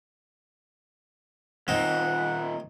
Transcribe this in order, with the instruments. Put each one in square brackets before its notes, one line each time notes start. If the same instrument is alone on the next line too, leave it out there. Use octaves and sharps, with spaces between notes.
[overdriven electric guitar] D#2 A#2 [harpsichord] C4 D#4 [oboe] F#5